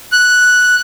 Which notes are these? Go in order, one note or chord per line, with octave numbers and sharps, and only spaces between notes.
F#6